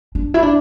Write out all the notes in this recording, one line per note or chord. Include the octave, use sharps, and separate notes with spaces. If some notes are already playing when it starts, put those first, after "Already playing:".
D4
E4
D4